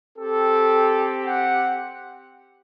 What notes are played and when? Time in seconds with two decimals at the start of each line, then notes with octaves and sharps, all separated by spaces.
0.17 C4 G4 A4
1.25 F#5